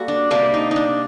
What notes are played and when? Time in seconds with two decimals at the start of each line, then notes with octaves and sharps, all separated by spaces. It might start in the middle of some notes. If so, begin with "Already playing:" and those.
Already playing: G3 A#3 F#4 A4
0.08 D4
0.31 C3 G3 A#3 D4
0.54 D#4
0.71 D4 D#4